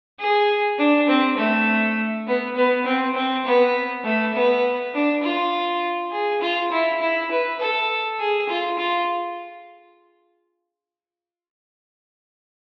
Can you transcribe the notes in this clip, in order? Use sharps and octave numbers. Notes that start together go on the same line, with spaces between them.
G#4
D4
C4
A3
B3
B3
C4
C4
B3
A3
B3
D4
F4
G#4
F4
E4
E4
B4
A4
G#4
F4
F4